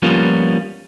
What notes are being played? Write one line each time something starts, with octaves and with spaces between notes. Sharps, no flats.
F3 G3 A#3 B3 C#4 F4